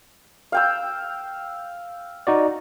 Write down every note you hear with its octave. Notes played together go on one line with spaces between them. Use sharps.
F5 G5 E6
D#4 F#4 D5